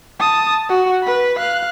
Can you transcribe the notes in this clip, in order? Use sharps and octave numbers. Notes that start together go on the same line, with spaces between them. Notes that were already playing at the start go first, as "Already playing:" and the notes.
A5 D#6
F#4
B4 B5
F5 F#6